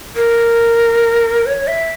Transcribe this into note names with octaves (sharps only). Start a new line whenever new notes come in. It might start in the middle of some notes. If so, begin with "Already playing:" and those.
A#4
C#5
E5